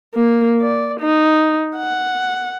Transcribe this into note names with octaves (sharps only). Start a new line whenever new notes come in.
A#3
D5
D#4
F#5